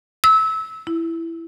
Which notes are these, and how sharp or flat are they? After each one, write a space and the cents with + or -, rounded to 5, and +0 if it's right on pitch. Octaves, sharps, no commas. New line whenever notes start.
E6 -25
E4 +10